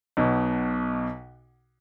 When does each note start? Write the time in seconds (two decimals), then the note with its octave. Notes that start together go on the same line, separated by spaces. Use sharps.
0.17 B1 B2